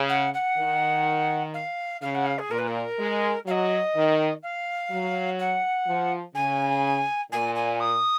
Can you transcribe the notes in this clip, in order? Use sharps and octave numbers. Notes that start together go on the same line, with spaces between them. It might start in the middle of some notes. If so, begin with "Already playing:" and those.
Already playing: C#3
F#5
F#5
D#3
F5
C#3 F5
F#5
F5
G#4
A#2 A#4
B4
A#4
G#3
F#3 F5
D#5
D#3
F5
F#3
F#5
F3
C#3 G#5
A#2 G#5
G#5
D#6